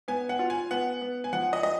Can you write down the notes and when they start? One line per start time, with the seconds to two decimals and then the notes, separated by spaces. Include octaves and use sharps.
0.08 B3 G#5
0.29 F#5
0.39 F4
0.50 G#5
0.71 B3 F#5
1.01 B3
1.24 G#5
1.33 F3 F#5
1.53 D#5
1.63 D#5